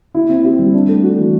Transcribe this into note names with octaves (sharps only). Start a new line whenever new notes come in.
E4
C4
G4
G3
D4
A3
F#4
E3